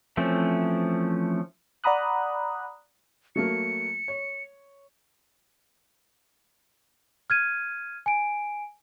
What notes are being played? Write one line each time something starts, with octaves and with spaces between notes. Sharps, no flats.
E3 F3 A3 C4 C#4
D5 F#5 A#5 B5 D#6 F#6
F#3 A3 A#3 C#7
C#5
F6 G#6 D#7
G#5 D7